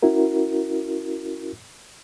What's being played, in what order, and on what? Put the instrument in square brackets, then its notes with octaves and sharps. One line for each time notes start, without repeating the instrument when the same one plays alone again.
[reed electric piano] C#4 E4 F#4 A#4